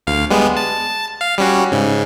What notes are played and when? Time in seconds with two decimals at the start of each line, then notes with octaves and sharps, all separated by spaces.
0.07 D2 F5
0.30 G3 G#3 B3
0.57 A5
1.21 F5
1.38 G3 C#4 F#4
1.72 G#2 C#3